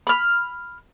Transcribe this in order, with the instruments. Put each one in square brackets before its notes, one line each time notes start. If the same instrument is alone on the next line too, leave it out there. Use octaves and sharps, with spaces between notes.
[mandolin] B5 F6